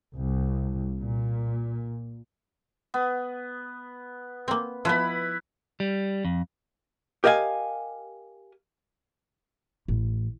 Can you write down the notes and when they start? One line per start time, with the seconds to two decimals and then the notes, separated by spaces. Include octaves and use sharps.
0.14 C2
1.00 A#2
2.94 B3
4.48 A#3 C4
4.85 F3 B3 E4 B4 B5
5.80 G3
6.25 F2
7.24 G4 A#4 D#5 F5 G#5
9.88 A1